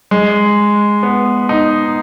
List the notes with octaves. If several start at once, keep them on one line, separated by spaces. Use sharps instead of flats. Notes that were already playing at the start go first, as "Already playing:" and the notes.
G#3
B3
D#4